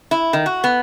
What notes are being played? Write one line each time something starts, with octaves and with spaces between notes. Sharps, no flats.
E4
D#3
F#4
B3